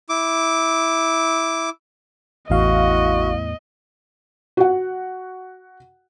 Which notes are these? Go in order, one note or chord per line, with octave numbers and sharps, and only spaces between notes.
E4 D6
A1 E2 A2 E3 F#4 D#5 F5
F#4 F#5